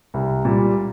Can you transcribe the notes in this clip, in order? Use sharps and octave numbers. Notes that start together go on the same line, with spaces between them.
C2
A#2 G3